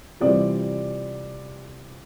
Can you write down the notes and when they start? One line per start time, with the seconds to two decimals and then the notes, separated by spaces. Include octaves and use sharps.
0.20 C3 E3 G3 C4 F4 D5